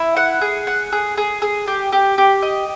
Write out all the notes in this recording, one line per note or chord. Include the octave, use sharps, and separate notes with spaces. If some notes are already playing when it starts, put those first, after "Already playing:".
Already playing: E4
F#5
G#4
F#5
G#4
G#4
G#4
G4
G4
G4
D#5